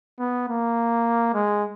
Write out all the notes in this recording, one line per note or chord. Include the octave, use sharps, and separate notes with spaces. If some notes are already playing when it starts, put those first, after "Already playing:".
B3
A#3
G#3